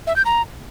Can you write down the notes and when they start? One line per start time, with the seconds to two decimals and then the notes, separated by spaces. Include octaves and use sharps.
0.07 E5
0.16 G6
0.25 A#5